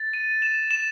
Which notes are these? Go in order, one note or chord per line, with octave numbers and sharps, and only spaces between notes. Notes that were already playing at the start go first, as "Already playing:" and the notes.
Already playing: A6
D#7
E7
E7